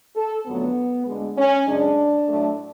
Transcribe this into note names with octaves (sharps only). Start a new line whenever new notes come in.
A4
F2 D3 F#3 A3 B3
D2 D3 G#3
C#4
F#2 C#3 G#3 D4
A2 F#3 A3